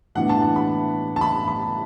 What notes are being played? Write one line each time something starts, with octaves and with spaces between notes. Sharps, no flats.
A2 E3 B3 D4 F#5
A5
A5
B5
A5
B5
B5